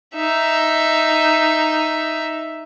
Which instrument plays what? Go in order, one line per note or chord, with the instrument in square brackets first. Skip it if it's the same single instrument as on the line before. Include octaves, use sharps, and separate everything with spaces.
[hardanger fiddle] D#4 E5